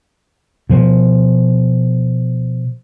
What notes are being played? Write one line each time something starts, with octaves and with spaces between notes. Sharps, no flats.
B2 F3